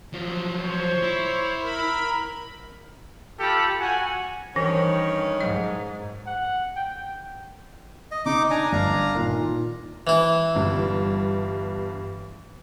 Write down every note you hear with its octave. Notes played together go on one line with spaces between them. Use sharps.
F3 F#3
C5 C#5
E4
A#4 B5
F4 G4 A4 B5
F#4 F#5 G#5
G2 D#3 E3 C#4
G#2 D#5
F#5
G5
D#5
C#3 D#4 D6
D4 G#5 A#5
G1 D4 F5 A#5
A#2 D#3
E3 E4
G1 G2